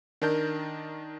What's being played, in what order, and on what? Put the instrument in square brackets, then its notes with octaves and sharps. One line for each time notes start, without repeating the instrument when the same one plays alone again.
[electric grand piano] D#3 D4 A#4 A5 G6